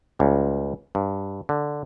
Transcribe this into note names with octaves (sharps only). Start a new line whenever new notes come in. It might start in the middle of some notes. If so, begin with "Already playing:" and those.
C#2 G3
G2
D3